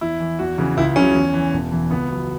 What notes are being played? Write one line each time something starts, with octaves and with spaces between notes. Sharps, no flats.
E2 E4
E3
E2 F#4
C#3 E3
C#2 E4
C#3 F#3 C#4
E2
E3
E1
E2 E3
C#2 B3
B2 F#3